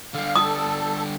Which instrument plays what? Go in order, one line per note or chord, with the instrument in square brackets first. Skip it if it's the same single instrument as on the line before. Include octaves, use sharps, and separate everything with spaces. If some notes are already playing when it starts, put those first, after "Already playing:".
[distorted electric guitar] D3 G3 [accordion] F5
[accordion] A4 [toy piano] D#6